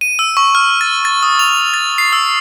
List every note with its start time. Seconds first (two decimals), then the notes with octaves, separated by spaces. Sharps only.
0.01 D#7
0.19 E6
0.37 C#6
0.55 F6
0.81 A6
1.05 A6
1.23 D#6
1.39 F7
1.74 A6
1.98 C7
2.13 E6